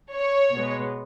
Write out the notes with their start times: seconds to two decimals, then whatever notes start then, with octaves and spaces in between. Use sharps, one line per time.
0.14 C#5
0.54 B2 G#3 B3